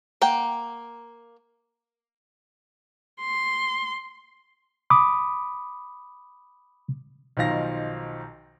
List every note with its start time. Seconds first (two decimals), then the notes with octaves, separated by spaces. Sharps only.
0.21 A#3 F#5 G5
3.21 C6
4.90 B5 D6 D#6
7.37 B1 D#3 F3 F5 A#6